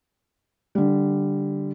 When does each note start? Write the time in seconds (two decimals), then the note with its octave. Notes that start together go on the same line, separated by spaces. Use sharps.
0.75 D3 G3